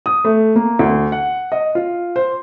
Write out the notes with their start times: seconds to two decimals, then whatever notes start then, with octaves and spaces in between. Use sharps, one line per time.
0.06 D#6
0.25 A3
0.56 A#3
0.79 D2
1.12 F#5
1.52 D#5
1.75 F4
2.16 C5